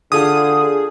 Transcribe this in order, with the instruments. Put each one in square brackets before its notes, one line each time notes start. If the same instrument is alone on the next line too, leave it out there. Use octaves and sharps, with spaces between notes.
[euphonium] D3 [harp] F4 G4 [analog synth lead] G#4 [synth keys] D#6